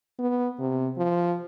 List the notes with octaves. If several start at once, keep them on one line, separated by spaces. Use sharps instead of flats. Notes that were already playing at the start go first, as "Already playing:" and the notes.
B3
C3
F3